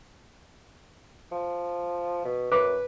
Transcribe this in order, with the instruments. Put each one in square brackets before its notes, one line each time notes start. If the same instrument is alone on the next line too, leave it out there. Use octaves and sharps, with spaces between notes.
[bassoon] F3
B2
[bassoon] F#2 [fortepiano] B4 D6